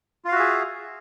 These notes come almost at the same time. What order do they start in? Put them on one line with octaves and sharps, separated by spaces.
F4 F5 F#4 E5 G#4